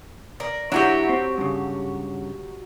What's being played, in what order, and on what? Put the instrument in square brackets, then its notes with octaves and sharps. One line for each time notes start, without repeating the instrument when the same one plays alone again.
[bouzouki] A#4 D5
[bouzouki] F#3 F#4 G4 [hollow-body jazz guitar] D4 E4
[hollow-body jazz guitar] C4
G2 C#3